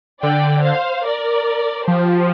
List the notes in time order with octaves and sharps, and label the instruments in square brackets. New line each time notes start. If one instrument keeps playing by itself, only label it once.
[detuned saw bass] D3 [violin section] D5 G5
[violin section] C5 F5
A#4 D5
[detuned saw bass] F3 [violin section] G4 C5